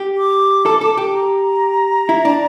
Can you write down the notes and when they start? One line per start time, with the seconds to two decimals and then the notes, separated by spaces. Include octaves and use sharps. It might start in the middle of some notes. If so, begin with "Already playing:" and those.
Already playing: G4
0.18 D6
0.66 A4
0.81 A4
0.97 G4
1.13 A#5
2.09 E4
2.25 D4